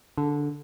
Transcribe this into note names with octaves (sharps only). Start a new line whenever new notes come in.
D3